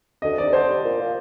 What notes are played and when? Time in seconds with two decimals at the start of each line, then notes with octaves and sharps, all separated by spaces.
0.22 D2 D#5
0.38 C3 D#3 D5
0.53 D3 C5
0.68 G3 D4
0.84 A#2
0.99 F3 C4 F4 C5